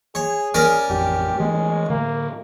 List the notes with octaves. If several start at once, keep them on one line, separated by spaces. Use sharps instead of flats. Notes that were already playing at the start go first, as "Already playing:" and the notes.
G#4 C#5
C#4 A#4 D5
A1 F2 G4
E3 G#3 A3 B3
A2 D3 A#3